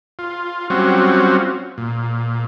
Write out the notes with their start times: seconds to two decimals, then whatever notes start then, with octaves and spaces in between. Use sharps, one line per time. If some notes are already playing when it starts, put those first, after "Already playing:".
0.19 F4
0.70 F#3 G3 C4 C#4 F4 F#4
1.78 A#2